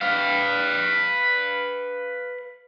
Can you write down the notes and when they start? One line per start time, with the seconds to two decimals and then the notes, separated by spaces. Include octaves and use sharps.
0.01 B4 F5